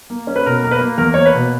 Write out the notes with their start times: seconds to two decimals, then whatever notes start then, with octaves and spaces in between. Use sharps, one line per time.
0.10 A#3
0.27 C#4
0.36 B4
0.46 B2 A#4
0.63 A#3 A#4
0.71 B4
0.81 A#3
0.98 E2 A#4
1.14 A#3 C#5
1.26 B4
1.34 B2